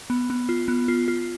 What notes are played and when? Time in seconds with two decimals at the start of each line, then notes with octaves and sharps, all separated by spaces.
0.10 B3
0.30 B3
0.49 F4
0.68 B3
0.88 F4
1.08 F4